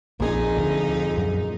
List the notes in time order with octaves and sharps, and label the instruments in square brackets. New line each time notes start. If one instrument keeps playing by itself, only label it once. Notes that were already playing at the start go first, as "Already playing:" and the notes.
[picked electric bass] A#1 [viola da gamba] F2 D#4 [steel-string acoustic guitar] A#2 G#4
[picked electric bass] D2
F#2